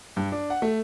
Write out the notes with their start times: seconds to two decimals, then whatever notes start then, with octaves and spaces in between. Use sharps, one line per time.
0.16 G2
0.32 D4
0.50 F#5
0.62 A3